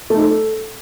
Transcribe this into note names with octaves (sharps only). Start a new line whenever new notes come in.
A3
D#4
A4